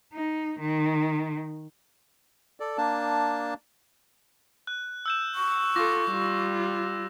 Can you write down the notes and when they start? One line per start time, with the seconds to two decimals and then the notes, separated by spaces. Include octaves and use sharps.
0.13 D#4
0.61 D#3
2.60 A4 D5
2.78 A#3 D4 A5
4.67 F#6
5.06 E6 G6 E7
5.35 C#6
5.75 F4 A4 D6 A#6
6.09 G3 F4